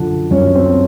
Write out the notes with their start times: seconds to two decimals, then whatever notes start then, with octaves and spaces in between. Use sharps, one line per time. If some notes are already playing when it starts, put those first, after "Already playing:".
Already playing: F#2 D3 F3 D4
0.31 F#2 C#4
0.55 C4